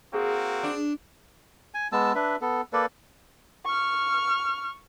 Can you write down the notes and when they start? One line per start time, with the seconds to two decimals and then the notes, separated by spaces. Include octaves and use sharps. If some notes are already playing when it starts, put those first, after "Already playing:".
0.14 A#3 C4 F#4 G#4
0.63 D4
1.74 G#5
1.92 G#3 B3 A5 E6
2.15 D4 B4 E5
2.41 B3 A4
2.73 A#3 A4 B4 D5
3.65 C#6 F6